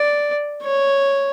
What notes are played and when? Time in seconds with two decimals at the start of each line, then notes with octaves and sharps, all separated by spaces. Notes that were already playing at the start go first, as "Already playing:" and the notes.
Already playing: D5
0.63 C#5